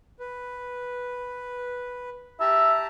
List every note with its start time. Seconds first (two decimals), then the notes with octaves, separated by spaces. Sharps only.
0.20 B4
2.40 G4 E5 A5 A#5